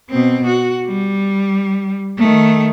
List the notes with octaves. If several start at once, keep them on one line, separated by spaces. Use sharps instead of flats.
B2 C4
F#4
G3
D#3 A3